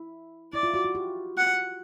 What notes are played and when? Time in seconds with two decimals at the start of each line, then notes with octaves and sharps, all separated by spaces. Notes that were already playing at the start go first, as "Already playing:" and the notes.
Already playing: E4
0.53 E4 D5
0.63 F4
0.74 F#4
0.85 F#4
0.95 G4
1.37 F#5